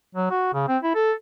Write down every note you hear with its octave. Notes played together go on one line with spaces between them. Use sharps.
F#3
F#4
C#3
C4
E4
A4